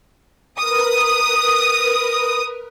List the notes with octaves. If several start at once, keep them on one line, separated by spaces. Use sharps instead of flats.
A#4 B4 D#6